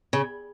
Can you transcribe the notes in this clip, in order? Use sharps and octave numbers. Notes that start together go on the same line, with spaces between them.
C#3